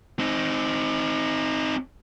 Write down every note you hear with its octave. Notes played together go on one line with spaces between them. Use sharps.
C4 D#4